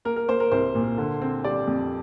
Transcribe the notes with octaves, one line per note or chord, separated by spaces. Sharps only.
A#3 A#4
A#4
A#3 C5
A#4
C2 C5
A#2
D3
C4
G3 D5
F2